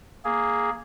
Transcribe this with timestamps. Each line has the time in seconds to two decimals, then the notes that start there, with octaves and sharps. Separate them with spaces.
0.25 A#3 G#4